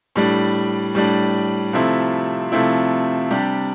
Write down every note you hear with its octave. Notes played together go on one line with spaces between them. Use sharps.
A2 G3 D4
A2 G3 D4
C3 F3 A3 C4 E4
C3 F3 A3 C4 E4
C3 G3 D4 G4